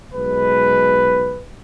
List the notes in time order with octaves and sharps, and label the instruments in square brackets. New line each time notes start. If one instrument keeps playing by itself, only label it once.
[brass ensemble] B1 G#3 B4